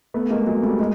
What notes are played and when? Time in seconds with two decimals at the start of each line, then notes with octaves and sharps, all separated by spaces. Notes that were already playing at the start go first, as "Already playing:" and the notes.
0.14 A3 B3
0.30 G#3 A#3
0.47 F#3 G#3
0.63 G3 A3
0.79 G#3 A#3